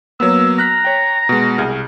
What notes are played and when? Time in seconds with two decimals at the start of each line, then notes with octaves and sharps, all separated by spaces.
0.20 F#3 A#3 B3 E6
0.58 A#5 F6 F#6 B6
0.84 C#5 G5
1.29 B2 G#3
1.58 C2 G#4 F6